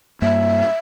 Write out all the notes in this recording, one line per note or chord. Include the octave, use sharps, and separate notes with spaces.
G2 A#3 E5